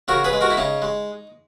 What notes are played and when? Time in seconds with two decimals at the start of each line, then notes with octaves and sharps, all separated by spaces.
0.08 C#3 F#4 A#4
0.24 G#4 B4
0.33 G#3
0.41 F#4 A#4
0.50 E4
0.57 C#3 D#4
0.82 G#3